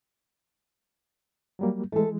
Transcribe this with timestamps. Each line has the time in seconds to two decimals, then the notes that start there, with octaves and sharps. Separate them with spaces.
1.59 F#3 G3 A#3
1.92 E3 G#3 A3 A4